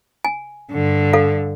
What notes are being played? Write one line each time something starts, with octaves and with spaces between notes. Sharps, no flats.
G#5
G2 D3
A4 F5